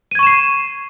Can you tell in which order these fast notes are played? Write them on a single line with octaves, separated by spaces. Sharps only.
D#7 G#6 C#6 E7 C7